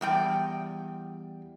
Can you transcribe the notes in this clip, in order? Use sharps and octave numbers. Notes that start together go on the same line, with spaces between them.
E2 G3 G5